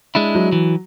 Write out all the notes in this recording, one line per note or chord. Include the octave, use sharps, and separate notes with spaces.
G#3 D4 E4
F#3
E3